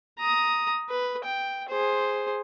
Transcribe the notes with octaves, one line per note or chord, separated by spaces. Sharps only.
A#5 D#6
B4
G5
G#4 C5